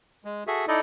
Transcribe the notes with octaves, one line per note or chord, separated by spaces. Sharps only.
G#3
F#4 G#4 A4 E5
D#4 E4 A4 D5 D#5